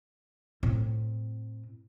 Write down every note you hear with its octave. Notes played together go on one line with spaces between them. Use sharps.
A2 C4